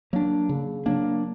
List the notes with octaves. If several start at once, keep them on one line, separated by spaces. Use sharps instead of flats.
F#3 A#3 D4
C#3
F#3 A#3 D4